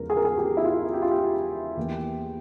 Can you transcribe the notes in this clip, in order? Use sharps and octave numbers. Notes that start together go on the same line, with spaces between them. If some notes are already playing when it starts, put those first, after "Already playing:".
Already playing: E2 C#3 F3 G#3 A#4
G#4
A#4
G#4
G4
E4
F4
G4
F4
G4
E2 E3 A#3